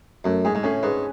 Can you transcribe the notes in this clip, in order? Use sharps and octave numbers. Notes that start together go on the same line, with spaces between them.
F#2 A3
G#2 G#4
G#2
A2 C#4
G#2 B4